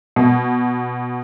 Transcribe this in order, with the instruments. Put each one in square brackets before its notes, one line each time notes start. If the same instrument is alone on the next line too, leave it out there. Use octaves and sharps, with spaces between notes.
[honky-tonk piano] B2